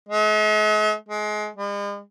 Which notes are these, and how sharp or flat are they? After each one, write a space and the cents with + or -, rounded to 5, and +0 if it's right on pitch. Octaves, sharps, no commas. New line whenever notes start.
G#3 +45
G#3 +25
G#3 -45